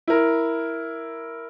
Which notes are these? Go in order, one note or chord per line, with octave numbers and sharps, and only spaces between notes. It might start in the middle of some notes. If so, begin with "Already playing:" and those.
E4 A#4